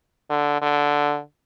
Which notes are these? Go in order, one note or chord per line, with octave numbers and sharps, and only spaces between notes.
D3
D3